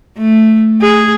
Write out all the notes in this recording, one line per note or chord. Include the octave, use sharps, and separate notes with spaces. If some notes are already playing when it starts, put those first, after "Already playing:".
A3
G#4